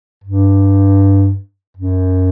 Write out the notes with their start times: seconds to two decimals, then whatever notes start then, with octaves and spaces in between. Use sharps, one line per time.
0.24 G2
1.77 F#2